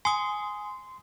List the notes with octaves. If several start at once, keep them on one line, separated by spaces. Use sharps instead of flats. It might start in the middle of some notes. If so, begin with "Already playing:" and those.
G#5 C6 D#6